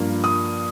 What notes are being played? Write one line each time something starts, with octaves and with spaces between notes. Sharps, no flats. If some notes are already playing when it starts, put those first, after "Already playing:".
Already playing: G2 F3 A#3
D#6